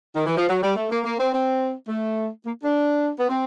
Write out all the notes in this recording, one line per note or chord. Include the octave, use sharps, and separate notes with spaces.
D#3
E3
F3
F#3
G3
A3
A#3
A#3
C4
C4
A3
A#3
D4
B3
C4